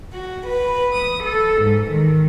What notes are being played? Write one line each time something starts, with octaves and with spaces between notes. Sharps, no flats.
F#4
B4
D#6
A4
G#2
D#3